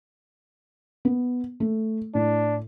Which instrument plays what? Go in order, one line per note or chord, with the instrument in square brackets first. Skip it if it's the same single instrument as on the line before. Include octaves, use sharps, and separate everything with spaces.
[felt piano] B3
A3
[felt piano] A2 [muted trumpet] D4